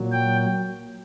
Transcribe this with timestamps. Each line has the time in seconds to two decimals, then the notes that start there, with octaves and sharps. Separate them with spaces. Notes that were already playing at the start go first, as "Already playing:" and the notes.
Already playing: A#2 F#3
0.12 G5